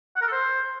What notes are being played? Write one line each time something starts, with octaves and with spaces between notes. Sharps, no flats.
F#5
A#4
A4
C5